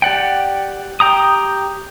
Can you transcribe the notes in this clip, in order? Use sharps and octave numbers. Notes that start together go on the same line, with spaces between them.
G4 D5 F#5 G5
G4 G5 A#5 D#6